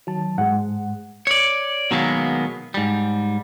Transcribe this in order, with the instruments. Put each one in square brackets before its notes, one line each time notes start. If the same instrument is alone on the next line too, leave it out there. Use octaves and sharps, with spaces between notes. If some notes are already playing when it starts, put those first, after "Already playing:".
[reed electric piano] D#3 A5 [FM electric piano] F#3
[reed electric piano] G#2 G#3 [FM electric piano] F#5
[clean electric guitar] C#5 D5
B2 D#3 F#3 G#3 A#3 B3
G#2 G3